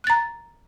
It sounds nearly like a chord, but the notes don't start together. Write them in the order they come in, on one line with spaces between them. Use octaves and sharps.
F#6 A6 A#5